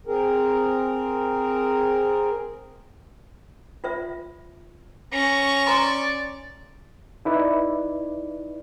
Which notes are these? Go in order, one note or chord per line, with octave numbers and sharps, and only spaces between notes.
C4 G#4 A#4
F4 C5 E5
C#4 A#5 C#6
C5 D5 A#5 C6
D#4 E4 B4 D5